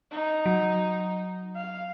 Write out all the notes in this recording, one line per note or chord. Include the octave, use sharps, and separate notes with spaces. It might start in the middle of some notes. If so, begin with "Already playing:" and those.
D#4
F#3
F5